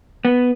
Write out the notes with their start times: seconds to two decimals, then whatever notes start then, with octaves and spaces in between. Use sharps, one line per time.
0.25 B3